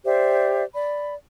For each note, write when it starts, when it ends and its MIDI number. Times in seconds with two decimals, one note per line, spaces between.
0.05 0.63 67
0.05 0.63 72
0.05 0.63 74
0.05 0.63 76
0.74 1.14 74
0.74 1.14 83